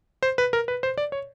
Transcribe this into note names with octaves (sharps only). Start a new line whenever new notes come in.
C5
B4
A#4
B4
C5
D5
C#5